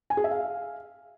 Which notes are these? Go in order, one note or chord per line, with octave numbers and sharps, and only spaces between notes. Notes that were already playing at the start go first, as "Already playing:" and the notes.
G#5
G#4
E5
F5